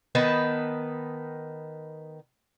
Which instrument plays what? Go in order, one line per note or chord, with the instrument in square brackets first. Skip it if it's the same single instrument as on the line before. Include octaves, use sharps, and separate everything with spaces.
[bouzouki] D#3 B3 B4 A5